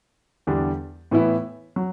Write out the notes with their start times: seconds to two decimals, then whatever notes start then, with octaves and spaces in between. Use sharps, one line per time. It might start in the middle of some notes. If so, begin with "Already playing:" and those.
0.47 E2 D3 G3 D4
1.11 A2 E3 B3 E4
1.76 F#3